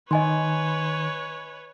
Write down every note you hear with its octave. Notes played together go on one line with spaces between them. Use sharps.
D#3 B4 C#5 D#5 G#5 C6